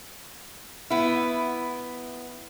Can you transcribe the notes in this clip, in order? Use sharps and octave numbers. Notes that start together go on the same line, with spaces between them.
B3 E4